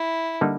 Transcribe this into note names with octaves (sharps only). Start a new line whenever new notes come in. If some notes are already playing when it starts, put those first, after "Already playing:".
Already playing: E4
D3 G3 A#3 D#4